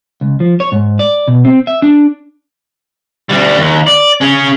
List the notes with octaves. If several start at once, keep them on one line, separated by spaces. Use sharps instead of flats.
C#2
F3
C#5
G#2
D5
B2
C4
E5
D4
D2 G3
D#2
D5
C#4 G#4